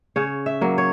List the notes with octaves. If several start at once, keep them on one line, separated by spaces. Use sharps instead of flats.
C#3 C#5
E5
F#3 A#3
C#5